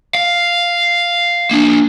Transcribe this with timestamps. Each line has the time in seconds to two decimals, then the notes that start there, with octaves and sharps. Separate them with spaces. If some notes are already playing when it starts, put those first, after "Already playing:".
0.15 F5
1.51 A#3 D4